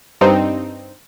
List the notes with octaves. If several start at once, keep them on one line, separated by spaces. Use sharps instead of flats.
G2 C4 D#4